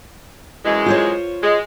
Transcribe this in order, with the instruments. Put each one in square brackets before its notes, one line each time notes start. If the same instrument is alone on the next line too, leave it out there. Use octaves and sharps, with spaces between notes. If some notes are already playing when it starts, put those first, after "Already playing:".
[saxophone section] F#2 E3 G#3
[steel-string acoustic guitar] F4 C5 C#5
[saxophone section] G#3